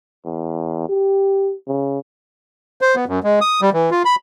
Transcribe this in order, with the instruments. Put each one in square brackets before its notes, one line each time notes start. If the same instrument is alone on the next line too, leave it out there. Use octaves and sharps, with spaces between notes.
[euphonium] E2
G4
C#3
[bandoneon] C5
B3
F#2
G#3
D#6
G3
E3
F4
B5